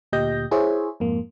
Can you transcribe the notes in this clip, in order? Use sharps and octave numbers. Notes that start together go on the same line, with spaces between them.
D2 A#2 G4 D#5 G6 A#6
E4 G#4 C5 C#5 E5
F2 G#2 A#3